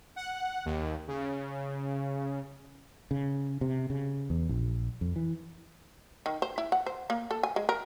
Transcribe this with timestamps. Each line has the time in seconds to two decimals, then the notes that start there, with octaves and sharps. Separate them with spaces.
0.16 F#5
0.65 D#2
1.08 C#3
3.11 C#3
3.61 C3
3.90 C#3
4.30 E2
4.49 A#1
5.01 F2
5.16 E3
6.26 D#3
6.42 C5
6.58 E4
6.72 F#5
6.86 C5
7.10 A#3
7.31 A4
7.43 G#5
7.56 G#3
7.69 A#4